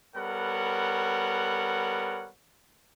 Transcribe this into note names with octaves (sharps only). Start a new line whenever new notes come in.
G3 B3 A4 A#4 C#5 F#5